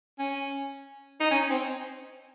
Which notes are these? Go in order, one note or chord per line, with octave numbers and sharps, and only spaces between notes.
C#4
D#4
C#4
C4